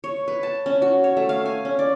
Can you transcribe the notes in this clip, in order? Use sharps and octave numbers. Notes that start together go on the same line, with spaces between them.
C#5
B4
A5
C#4
F#4
C#5
A3
F5
G#5
C#4
D5